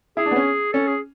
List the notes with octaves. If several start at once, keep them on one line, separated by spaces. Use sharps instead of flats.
E4 G#4
D4
B3
C#4
C#4 A4
G#4